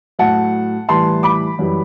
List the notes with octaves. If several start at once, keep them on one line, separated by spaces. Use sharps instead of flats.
A2 F#3 F#5 A5
A2 E3 G3 A5 C6
B5 D6
F#2 E3 G3